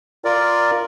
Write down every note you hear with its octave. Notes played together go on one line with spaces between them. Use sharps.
F4 A#4 D5